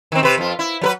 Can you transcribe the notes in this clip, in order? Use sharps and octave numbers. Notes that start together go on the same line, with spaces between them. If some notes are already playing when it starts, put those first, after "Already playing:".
D#3 C4
C3 B4
F2 F4
E4
F#3 A#4 B4